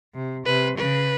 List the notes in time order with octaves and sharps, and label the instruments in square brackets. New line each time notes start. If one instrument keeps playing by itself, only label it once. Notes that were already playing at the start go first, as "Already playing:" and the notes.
[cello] C3
[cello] C3 [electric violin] B4
[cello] C#3 [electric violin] B4